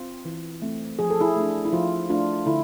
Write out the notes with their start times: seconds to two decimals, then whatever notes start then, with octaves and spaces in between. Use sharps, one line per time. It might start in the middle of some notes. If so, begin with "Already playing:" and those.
Already playing: C4 F4
0.25 E3
0.62 A3 C4
0.99 F3 G#4
1.10 A4
1.21 E4 G#4
1.36 A3 D4
1.65 E4
1.72 F3 F4
2.10 A3 D4 F4
2.46 D3 E4